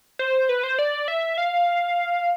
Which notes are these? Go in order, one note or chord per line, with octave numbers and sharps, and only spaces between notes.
C5
B4
C5
D5
E5
F5